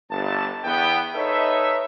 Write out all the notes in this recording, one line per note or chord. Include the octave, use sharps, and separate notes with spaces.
G1 A5
E2 B3 G5
D#4 A4 B4 C#5 D#5 E5